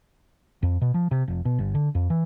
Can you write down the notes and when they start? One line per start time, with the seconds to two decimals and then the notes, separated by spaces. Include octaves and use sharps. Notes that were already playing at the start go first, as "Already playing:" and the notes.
0.63 F2
0.81 B2
0.94 F3
1.11 C3
1.28 F1
1.45 B2
1.59 G1
1.75 D3
1.95 F2
2.10 E3